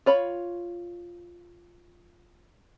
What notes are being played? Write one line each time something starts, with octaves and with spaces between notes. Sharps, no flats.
F4 C#5 B5